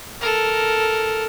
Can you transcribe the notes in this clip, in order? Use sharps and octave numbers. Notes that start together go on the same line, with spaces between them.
A4 A#4